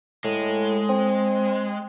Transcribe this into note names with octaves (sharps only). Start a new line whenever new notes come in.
A2 G#3
C4